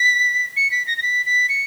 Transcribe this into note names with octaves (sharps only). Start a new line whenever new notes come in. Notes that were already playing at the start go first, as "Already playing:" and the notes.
Already playing: B6
C#7
B6
A#6
A#6
B6
B6
C#7